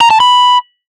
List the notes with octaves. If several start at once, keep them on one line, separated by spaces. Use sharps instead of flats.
A#5
A5
B5